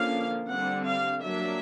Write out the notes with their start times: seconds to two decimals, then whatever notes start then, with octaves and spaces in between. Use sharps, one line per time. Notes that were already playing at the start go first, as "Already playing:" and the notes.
Already playing: D3 F3 A#3 C#4 F5
0.49 D3 G3 C4 F#5
0.86 F5
1.23 F#3 A#3 D4 E5